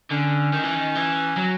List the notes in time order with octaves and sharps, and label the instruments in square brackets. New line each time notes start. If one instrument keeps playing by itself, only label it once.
[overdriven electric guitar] D3 [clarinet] C#4
[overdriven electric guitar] D#3
E3
D#3
E3
F#3